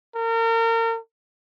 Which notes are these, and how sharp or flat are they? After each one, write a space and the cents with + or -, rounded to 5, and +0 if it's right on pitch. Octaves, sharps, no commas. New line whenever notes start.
A#4 -35